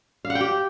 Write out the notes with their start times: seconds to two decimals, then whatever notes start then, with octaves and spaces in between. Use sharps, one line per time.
0.25 F5
0.30 F#5
0.35 G5
0.41 G4